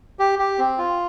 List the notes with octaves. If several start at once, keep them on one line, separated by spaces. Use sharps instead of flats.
G4
G4
C4
F4